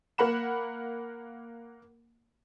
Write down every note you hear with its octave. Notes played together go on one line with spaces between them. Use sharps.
A#3 A#4 F#5 B5 E7